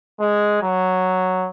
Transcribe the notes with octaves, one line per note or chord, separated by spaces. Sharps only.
G#3
F#3